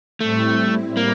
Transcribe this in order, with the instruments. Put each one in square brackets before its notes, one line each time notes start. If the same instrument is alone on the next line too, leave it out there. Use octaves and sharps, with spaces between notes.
[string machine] A2 G3 C4 E4 [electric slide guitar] A3
[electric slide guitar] A#3